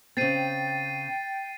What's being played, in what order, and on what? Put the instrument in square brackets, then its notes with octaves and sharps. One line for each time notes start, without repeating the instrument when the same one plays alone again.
[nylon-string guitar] C#3 C4 [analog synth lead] G5 [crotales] A6 C7 D#7